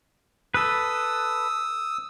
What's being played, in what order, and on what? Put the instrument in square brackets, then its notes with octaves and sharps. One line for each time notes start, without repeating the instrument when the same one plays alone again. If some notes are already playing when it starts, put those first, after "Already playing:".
[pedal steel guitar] A4 B4 [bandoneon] D#6 E6